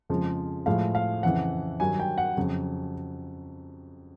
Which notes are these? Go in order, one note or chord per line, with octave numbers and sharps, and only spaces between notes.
F2 C#3 F3 G#3
A2 F3 G#3 F5
F5
F2 C#3 E3 F#5
G2 D#3 F#3 G#5
G5
F#5
F2 C#3 F#3